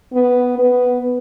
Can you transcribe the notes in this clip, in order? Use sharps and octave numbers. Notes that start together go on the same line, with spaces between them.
B3
B3